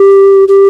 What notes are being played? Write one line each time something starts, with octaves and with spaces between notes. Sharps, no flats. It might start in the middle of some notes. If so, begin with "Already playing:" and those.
Already playing: G4
G4